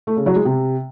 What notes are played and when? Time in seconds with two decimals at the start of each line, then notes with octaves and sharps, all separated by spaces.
0.07 A3
0.17 C#3
0.26 F#3
0.36 G#3
0.45 C3